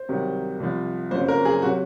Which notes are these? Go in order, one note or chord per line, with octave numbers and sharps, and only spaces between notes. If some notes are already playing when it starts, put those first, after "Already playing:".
Already playing: C5
C2 C3 D#3 F#3
C2 C3 F3
F#1 F2 C#3 F#3 C5
A#4
G#4
C3 F#3 F#4